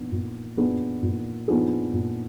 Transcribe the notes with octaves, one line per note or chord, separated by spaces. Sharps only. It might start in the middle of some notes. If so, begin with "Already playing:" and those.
Already playing: A#2 F3 B3 D4
A#2
F3 B3 D4 G#4
A#2
F3 B3 D4 G#4
A#2